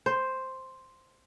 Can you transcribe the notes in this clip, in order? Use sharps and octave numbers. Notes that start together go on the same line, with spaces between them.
C5